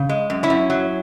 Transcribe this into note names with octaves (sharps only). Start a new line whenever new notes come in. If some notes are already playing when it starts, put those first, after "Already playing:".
Already playing: C#3
G#3
F#2
C#4 E4
F#2
F#3